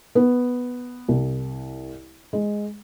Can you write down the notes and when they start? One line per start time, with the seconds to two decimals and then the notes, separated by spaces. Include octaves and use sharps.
0.15 B3
1.08 C2
2.33 G#3